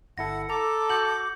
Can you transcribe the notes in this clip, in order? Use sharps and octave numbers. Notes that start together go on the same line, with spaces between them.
G1 E4 A4 F#5 A#6
A4 A#5 D6
F#4 G6 C#7 F#7